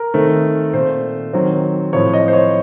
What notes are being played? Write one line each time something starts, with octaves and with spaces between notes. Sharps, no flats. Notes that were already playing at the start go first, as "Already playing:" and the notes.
Already playing: A#4
D#3 A3 C4
A#2 A3 C4 C5
D#3 F#3 C4
A2 F3 C4 C#5
D#5
C5
C#5